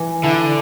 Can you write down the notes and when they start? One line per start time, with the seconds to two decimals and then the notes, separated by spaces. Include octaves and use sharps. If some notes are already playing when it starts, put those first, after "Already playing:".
Already playing: E3
0.23 D3 E4